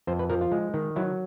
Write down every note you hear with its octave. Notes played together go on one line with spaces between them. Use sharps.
F2 C5
B4
F3 A#4
F4
G#3
D#3
F#3 E4